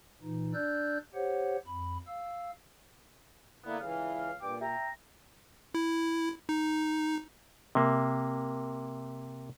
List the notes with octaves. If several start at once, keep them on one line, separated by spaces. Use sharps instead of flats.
A#2 E3 D#4
D4 D5 E6 F#6 G6
G4 C5 C#5 F#5
F2 B5
F5 E6
D3 A#3 B3 E4
C#2 E3 F5
G2 A#2 G5 D6
E5 G5 A#5
E4
D#4
C3 A#3